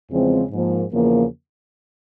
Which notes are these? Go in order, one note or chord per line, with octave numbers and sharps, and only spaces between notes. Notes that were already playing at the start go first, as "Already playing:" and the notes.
E2 C#3 F3 G#3 C4
G#2 F3 A#3
E2 C#3 F3 A#3